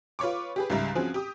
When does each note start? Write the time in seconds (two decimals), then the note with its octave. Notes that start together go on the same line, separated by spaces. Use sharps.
0.19 F4 B4 C#5 C#6 D6
0.56 G4 G#4 B4
0.70 C#2 G#2 G3 E5 A#5
0.95 F3 C4 C#4 F#4 G#4
1.14 G4 D#6